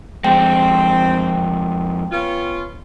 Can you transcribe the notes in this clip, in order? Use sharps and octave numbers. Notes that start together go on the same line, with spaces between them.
F2 G#3 C4 G5
B3 C#4 F4